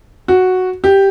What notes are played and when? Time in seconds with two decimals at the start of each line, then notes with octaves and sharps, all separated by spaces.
0.28 F#4
0.84 G4